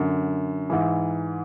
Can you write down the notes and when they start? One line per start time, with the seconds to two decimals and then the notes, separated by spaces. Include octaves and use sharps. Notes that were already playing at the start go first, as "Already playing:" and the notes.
Already playing: F#2 D3
0.70 G#2 E3